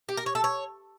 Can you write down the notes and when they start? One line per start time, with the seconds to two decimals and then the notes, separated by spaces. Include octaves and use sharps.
0.09 G4
0.17 A#4
0.26 C#5
0.35 A4
0.44 C#5